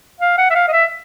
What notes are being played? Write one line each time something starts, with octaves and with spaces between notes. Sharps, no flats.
F5
F#5
E5
F5
D#5
E5